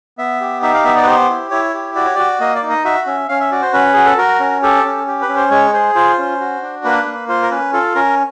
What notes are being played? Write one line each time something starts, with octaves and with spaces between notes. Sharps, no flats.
B3 E5
G4
D#4 E5
F5
B3 E5
D5
B4
G4 C5
E4
E4 C#5
G4
F#4 D5
C#5
F#4 D5
A#3 D#5
D5
D#4
D#5
F#4 E5
C#4 E5
C#4 F5
E5
F#4 D5
C5
C#4 B4
F#4 G#4
A4
F#4 A#4
C#4
G4 A4
C#4
G4
B4
C#4
C5
G#3 C#5
G#4 C5
F4 C5
C#4
F#4
D4
A#3 B4
A#3
F4 C5
A#4
C#4 B4
F4 A4
C#4 A#4